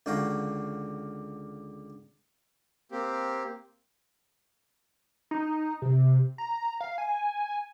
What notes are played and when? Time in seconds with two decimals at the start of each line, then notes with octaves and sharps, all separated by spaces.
0.06 C#2 D3 F#4 F5 G5 A#5
2.92 A#3 C4 G4
5.31 D#4
5.82 C3
6.38 A#5
6.81 F5
6.98 G#5